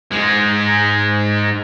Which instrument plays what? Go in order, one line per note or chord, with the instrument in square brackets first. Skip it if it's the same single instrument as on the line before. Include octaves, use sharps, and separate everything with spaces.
[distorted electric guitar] G#2 G#3